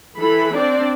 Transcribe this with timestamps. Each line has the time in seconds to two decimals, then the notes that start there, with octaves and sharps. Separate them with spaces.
0.18 E3 A4 B5
0.56 C4 D4 D5